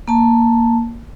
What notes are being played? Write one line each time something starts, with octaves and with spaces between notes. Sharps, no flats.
A#3 A5